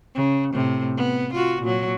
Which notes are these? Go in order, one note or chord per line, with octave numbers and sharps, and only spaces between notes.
C#3
A2 C3
B3
F4 F#4
A#2 F#3